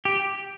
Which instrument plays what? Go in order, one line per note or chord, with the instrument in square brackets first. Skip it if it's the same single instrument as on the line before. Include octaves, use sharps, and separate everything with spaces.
[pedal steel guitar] G4